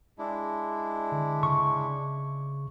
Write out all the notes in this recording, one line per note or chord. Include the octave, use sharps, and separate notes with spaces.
G#3 D4 E4
D3
C#3 C#6